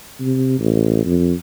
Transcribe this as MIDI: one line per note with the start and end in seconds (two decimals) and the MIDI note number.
0.20 0.55 48
0.59 1.03 33
1.05 1.33 41